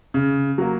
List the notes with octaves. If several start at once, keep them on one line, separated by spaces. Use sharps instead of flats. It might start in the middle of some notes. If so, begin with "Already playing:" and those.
C#3
F#3 A#3